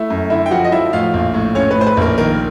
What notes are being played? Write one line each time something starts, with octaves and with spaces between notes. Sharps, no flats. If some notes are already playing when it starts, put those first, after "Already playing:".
Already playing: A3 E4 E5
F#2
D3 E4 E5
G5
F3 F#4 F#5
D#5
F3 E4 E5
A2 F4 F5
A#1
A2
A2 C#4 C#5
A2 B4
C5
B4
A#1 A#4
D#3 A#4